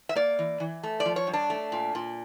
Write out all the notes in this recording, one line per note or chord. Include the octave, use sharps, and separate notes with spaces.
E5
A#3 D5
E3
E3
A3
D5
F3
C#5
G2
D4
A3
A#2
A#2